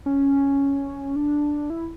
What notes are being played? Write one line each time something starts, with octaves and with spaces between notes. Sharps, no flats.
C#4
D4
E4